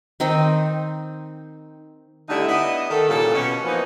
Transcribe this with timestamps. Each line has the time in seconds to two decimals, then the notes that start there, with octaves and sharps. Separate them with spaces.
0.20 D#3 C4 D#4
2.29 D3 G3 A3 D#4 E4
2.47 B3 D4 E4 D#5
2.90 D#3 A4
3.08 A#2 C#3 E3 G3 A4
3.33 B2 C#4
3.64 E3 F3 A#3 B3 D#4